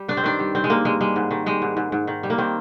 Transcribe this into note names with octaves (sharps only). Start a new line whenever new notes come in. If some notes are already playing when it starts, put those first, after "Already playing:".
Already playing: G3
G2 D4
C4
D#3 D4
G3
G2 C4
G#3
G3 A#3
G2 G#3
G3 G#3
G#2
D#3
G3 G#3
G#2
G#2
G#2
D#3
G3
A#3
D#3 C4